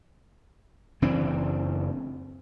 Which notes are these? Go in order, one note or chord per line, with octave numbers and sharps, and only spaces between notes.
F#1 E3 C4 D4